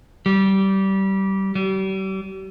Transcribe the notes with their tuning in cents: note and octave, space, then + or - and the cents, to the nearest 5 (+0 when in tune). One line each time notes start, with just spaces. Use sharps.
G3 -20
G3 -40